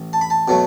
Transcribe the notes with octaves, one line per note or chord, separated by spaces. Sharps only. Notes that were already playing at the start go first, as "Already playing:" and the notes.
Already playing: A1
A5
B5
A5
B2 F#3 A3